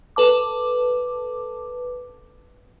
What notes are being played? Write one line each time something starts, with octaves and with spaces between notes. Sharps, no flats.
A4 B4 A5 D6